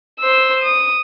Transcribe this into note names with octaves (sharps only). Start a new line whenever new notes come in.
C5 E6
D#6